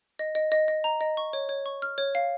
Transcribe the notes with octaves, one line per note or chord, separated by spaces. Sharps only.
D#5
D#5
D#5
D#5
A#5
D#5
C#6
C#5
C#5
C#6
F6
C#5
F5